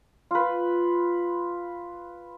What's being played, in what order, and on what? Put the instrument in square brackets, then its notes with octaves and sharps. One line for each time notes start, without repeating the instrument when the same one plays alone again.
[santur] F4 B4